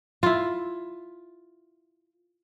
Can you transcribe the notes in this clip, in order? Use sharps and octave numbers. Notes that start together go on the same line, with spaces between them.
E4 F4